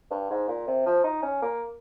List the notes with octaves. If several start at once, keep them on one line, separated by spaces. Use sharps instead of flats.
G2
G#2
A#2
C3
F3
D#4
C#4
A#3